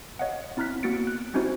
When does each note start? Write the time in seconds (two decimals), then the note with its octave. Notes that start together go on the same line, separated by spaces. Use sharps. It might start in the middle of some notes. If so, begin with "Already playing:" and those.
0.19 C#5 D#5 F5 F#5
0.57 C4 E4 A#5 F6 F#6 B6
0.83 A#3 B3 F#4 A6 C#7 D7
1.07 F#6
1.34 C4 C#4 D#4 E4 F#4 C5